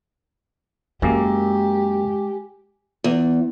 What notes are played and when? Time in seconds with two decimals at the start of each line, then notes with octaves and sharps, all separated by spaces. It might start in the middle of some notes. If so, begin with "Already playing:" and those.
1.02 F#2 G#3 A#3 G4 G#5 D6
3.04 E2